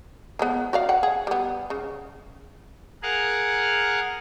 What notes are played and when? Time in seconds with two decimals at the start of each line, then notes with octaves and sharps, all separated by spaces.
0.39 F3 G#3 B3
0.73 F#4 D5 F5
0.89 F#5 G5
1.03 G#4
1.27 G3 B3
1.70 C#3
3.02 G#4 A#4 F5 F#5